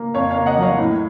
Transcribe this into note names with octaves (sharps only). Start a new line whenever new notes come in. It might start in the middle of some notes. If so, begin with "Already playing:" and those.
Already playing: A#3
F2 C#5 F5
C#5 F5
A#3
D#5 F#5
F#3 C#5 F5
A2